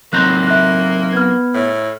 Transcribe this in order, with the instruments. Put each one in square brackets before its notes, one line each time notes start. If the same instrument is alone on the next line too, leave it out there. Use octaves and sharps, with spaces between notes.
[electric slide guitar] F#3 C4 D#4 [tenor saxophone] A#3 [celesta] F#6 G6
[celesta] E5 F#6
[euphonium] B3 [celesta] F6 G#6
[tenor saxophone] A2